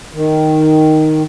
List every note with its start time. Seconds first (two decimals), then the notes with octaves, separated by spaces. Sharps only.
0.14 D#3